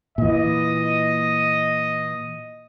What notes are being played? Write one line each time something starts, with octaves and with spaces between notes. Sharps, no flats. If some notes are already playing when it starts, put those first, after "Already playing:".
A#2 E3 D#5